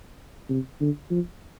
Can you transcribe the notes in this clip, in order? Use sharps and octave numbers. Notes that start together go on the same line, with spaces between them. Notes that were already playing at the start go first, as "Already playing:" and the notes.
C3
D3
F3